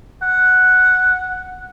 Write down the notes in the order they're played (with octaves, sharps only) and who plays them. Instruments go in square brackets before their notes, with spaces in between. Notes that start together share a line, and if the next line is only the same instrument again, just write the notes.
[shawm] F#5